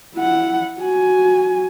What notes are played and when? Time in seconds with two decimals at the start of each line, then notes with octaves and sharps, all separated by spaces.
0.15 E4 F#5
0.81 F#4 G#5